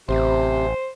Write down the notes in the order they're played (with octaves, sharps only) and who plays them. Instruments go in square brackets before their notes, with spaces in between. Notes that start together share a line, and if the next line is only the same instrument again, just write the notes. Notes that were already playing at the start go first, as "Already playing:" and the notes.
[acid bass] A1 [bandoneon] C3 [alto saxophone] C5